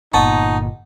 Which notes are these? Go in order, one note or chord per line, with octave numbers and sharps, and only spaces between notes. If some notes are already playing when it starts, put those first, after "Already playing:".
G1 A#2 B3 D#4 A5 C#6